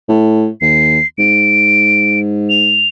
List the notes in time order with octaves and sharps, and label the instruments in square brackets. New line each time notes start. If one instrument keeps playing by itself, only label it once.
[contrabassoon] A2
[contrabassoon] D#2 [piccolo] C7
[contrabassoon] G#2 [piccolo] D7
[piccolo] F7